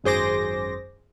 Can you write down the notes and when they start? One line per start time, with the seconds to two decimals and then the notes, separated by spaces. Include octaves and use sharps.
0.04 G#1 F#2 G#4 C5 D6 A#6